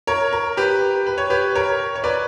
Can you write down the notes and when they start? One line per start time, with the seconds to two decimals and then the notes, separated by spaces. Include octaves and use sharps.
0.07 A#4 C#5
0.33 A#4
0.57 G4 B4
1.07 B4
1.18 C#5
1.30 G4 B4
1.55 A#4 C#5
1.95 C#5
2.04 B4 D5